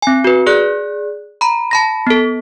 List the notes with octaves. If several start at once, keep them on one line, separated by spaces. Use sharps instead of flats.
C4 G#5
F#4 B4
G#4 D5 F#6
A#5 B5
A5 B5 A#6
B3 A4